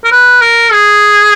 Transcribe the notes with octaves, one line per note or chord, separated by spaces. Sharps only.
A#4
B4
A#4
G#4